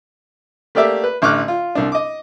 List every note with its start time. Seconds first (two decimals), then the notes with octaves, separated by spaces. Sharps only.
0.75 A3 A#3 G4 D5 E5
1.04 B4
1.22 A1 D3 C#6 D6 F6 F#6
1.48 F4
1.75 C2 D4
1.92 D#5 D6